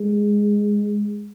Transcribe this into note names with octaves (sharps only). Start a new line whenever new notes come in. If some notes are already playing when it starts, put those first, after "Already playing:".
Already playing: G#3